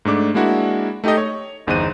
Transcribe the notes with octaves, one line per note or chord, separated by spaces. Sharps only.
G#2 A3 D4 D6
G#3 A#3 D4 E4 F#4
A3 D#4 G4 A4 D#5
C#5
G1 E2 D#4 C5 F#6 D#7